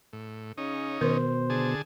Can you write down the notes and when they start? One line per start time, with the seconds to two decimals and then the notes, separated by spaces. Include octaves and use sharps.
0.13 A2
0.57 C#3 C#4 D#4
1.01 B2 D#3 A#4 C5
1.50 D3 G#4 A5